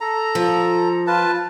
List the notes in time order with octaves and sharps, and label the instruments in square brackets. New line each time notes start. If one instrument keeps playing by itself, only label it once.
[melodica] A4 A#5
[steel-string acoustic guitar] F3
[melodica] F4 B4 A5